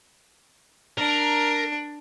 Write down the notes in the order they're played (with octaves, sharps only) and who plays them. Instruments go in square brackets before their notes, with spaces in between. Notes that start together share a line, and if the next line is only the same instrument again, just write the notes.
[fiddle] D4 [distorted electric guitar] A#4